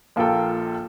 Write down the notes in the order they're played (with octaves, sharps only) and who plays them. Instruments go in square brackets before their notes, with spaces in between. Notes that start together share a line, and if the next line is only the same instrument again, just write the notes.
[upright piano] A#1 A#3 F4 A4 G5